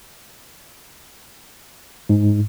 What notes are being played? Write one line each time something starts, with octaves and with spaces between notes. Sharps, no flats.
G#2